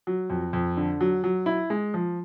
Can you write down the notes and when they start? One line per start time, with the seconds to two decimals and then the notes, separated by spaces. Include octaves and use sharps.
0.07 F#3
0.30 F2
0.53 F2
0.77 D3
1.01 F#3
1.24 F#3
1.46 E4
1.70 G#3
1.94 F3